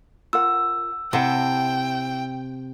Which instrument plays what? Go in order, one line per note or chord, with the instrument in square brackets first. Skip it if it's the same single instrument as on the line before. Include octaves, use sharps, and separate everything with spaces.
[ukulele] F4 A#4 F#5 [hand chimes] E6
[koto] C3 [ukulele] E4 F#5 A5 [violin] G5